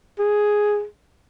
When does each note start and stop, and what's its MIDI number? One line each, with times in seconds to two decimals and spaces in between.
0.19 0.85 68